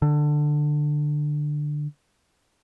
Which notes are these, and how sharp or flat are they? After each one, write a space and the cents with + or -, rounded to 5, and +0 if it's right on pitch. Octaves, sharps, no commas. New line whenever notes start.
D3 +15